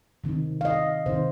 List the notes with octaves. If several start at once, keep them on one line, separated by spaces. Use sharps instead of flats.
C3 D#3 C4 D#4
F5
D#5
C3 D#3 C4 D#4 C5